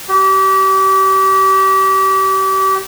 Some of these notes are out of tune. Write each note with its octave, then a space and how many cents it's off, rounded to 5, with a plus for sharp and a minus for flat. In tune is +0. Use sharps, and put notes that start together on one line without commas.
G4 -30